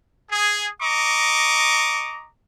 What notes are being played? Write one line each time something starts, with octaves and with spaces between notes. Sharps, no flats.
G#4
D#5 A#5 C#6 D6